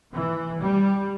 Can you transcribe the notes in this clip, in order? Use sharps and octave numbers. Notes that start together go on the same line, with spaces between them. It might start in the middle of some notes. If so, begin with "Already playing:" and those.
E3
G3